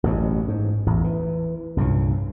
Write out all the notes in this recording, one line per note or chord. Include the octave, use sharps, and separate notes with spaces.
A1 F#2 B2
G#2
A1 E2
E3
C2 G2 A#2 C#3